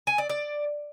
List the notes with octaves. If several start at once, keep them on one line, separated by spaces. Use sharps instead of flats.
G#5
D5
D5